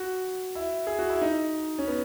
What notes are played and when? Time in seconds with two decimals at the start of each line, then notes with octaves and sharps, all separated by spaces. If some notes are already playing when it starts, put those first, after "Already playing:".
Already playing: F#4
0.55 E4
0.87 G#4
0.99 F#4
1.10 E4
1.22 D#4
1.78 C#4
1.87 B3